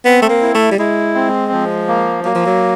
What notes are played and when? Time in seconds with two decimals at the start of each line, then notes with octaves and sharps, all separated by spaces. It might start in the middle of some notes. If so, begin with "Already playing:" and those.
0.05 B3 C4
0.22 A3
0.29 A#3
0.42 E4
0.55 A3
0.71 G3
0.79 G#3 E4
1.15 C4
1.52 F3
1.88 A#3
2.24 F#3 A#3
2.35 F3
2.46 F#3